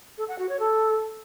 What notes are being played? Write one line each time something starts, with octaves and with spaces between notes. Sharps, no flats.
A4
F#5
F#4
C#5
A4